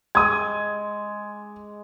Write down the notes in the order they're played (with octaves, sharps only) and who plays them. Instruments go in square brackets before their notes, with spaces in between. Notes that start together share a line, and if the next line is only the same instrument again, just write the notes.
[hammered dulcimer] G#3 [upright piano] D#6 G#6